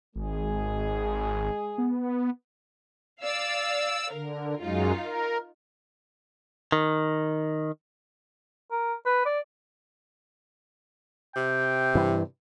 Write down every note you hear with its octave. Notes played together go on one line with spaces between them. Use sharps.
G#1 G#3 G#4
B3
D5 F5 E6
D3 A#4
F#2 F#3 G#3 D#4 F4
A#4
D#3
A#4
B4
D5
C3 G5
G2 E3